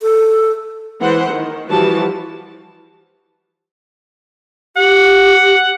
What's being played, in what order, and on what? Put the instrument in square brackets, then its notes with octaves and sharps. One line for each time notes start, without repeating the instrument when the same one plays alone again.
[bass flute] A4
[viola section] E3 G#3 C5 F#5 C6
D#3
E3 F3 G3 F#4 A5
[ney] G4 [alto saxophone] F#5